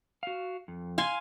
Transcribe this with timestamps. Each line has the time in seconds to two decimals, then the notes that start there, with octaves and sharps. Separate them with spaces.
0.23 F#4 F5
0.68 F2
0.98 F5 G#5 C6